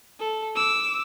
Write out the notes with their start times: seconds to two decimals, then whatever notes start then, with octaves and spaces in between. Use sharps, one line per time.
0.20 A4
0.56 D6 E6